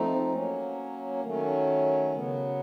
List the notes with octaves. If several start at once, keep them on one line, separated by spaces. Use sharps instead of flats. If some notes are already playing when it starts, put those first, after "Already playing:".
Already playing: F3 A3 C4 D#4
F#3 A#3 C#4
D#3 F#3 A3 C#4
C#3 F#3 B3